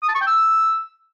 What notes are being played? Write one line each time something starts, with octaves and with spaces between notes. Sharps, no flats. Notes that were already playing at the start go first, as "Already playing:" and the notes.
D#6
A5
C#6
G5
E6